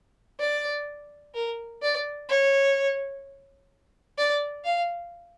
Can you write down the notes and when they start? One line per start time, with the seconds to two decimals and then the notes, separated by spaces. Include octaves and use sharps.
0.40 D5
1.34 A#4
1.82 D5
2.30 C#5
4.18 D5
4.65 F5